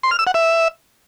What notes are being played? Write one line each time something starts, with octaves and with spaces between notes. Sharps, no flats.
C6
F6
E6
F#5
E5